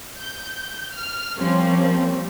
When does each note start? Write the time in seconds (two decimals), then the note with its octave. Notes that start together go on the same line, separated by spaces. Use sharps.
0.18 G6
0.92 F6
1.38 F3 G3 A#3 C4 C#4